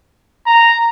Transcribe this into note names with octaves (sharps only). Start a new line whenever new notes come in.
A#5